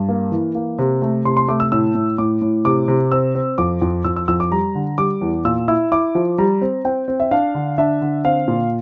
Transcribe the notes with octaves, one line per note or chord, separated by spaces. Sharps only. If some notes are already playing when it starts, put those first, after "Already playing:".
Already playing: G2
A#3
E3
A#3
C3
A3
C3 C6
C6
A3 D6
E6
A2 E6
A2
A2 D6
A2
C3 D6
C3
C4 E6
C4
F2 D6
F2
F2 E6
E6
F2 E6
D6
G3 A#5
D3
G3 D6
E2
A#2 E6
E4 E6
E4 D6
F3
G3 A#5
C4
C4 G5
C4
E5
D4 F5
D3
D4 E5
D3
C4 F5
A#2